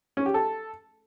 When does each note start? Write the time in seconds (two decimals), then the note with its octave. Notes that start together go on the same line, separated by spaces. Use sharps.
0.17 C#4
0.26 G4
0.34 A4